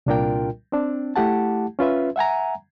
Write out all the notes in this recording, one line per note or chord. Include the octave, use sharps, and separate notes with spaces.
C2 A#2 D4 F4 A#4 G5
C4 D4
A3 E4 G4 F#5 A5
C#4 F4 B4 E5
E5 F#5 G#5 A#5